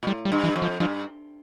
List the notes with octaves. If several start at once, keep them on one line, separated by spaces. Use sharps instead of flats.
A#2
A2 G3
G3
G2
E3
F2
F3
G2 F3